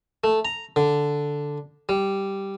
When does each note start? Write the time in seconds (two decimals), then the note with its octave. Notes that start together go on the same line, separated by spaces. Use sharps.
0.24 A3
0.45 A#5
0.76 D3
1.89 G3